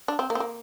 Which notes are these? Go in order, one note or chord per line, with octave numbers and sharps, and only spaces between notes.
D4
C4
A#3
C4
A#3